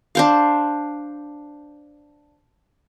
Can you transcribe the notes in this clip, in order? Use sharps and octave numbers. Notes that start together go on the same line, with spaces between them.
D4 C5 F5